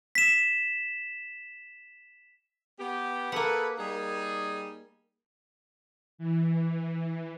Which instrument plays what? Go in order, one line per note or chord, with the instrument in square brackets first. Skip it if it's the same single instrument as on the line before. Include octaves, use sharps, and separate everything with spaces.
[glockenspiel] B6 E7
[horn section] B3 G4
[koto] A#3 F#5 [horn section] G#4 A4 B4
[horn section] G3 D#4 G#4
[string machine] E3